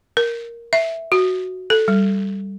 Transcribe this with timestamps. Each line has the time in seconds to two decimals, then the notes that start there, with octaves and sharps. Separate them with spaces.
0.17 A#4
0.73 E5
1.12 F#4
1.70 A4
1.88 G3